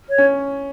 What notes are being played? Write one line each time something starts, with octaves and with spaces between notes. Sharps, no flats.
C#5
C#4